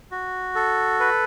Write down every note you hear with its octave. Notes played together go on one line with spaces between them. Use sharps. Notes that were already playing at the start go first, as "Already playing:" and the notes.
F#4
A4
B4